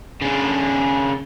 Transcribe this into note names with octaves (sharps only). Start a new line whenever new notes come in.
C#3 D4